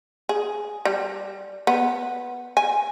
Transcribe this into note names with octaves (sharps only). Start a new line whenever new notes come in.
G#4
G3
B3
G#5